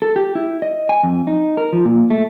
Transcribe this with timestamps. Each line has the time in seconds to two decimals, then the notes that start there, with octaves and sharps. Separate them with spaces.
0.02 A4
0.16 G4
0.35 E4
0.62 D#5
0.89 G#5
1.03 F2
1.27 D#4
1.57 A#4
1.73 F3
1.85 A#2
2.10 A3